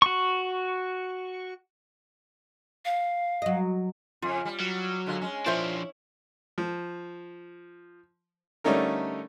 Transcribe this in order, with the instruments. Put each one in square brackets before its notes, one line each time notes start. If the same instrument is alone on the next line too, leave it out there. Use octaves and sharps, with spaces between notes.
[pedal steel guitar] F#4 C#6
[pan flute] F5
[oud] F#3 D#5
[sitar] F2 C#3 [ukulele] F4
[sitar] G3
[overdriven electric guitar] F#3
[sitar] D3 G#3 F4
G#3 C#4
[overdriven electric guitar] F3 D4 [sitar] E4 C#5 [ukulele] F4 C5 E5
[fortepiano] F3
D3 G3 A3 C#4 D#4 A#4